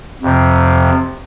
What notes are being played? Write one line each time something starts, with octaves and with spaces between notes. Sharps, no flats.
F2 C3 F3